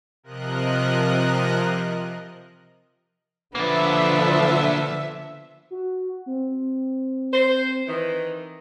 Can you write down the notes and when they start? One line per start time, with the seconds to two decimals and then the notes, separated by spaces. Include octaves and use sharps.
0.23 C3 F3 A#4 D#5 F#6
3.55 D3 F3 A#3 B3 D4 E5
5.71 F#4
6.26 C4
7.32 C5
7.88 D#3 E3